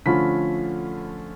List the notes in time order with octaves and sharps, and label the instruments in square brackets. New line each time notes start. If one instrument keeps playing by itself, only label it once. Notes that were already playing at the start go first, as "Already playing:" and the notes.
[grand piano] D3 F3 A3 C#4 F4 B5 B6